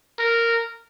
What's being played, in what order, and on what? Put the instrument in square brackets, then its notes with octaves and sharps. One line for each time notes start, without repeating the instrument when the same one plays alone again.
[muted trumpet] A#4